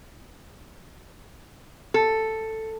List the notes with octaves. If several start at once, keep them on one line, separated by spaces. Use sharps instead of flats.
A4